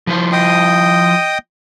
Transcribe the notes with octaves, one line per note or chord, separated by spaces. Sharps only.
F3 E4 C5
D#5 G5 D#6